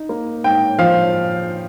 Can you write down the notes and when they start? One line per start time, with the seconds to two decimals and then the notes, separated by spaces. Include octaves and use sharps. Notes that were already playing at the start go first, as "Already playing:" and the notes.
Already playing: D#4
0.09 A#3
0.44 G#2 G5
0.79 F3 F5